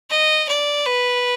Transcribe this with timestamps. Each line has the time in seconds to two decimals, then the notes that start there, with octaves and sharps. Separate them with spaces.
0.10 D#5
0.49 D5
0.86 B4